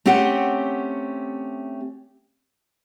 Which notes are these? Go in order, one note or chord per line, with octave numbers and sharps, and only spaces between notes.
A3 C4 C#4 G4 F#5